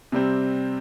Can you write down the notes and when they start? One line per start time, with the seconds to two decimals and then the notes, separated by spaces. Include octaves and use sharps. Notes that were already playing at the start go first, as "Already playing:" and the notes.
0.12 C3 G3 C4